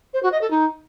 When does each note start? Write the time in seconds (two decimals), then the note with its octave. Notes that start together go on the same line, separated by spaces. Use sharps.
0.13 C5
0.23 F#4
0.32 D#5
0.41 A4
0.50 D#4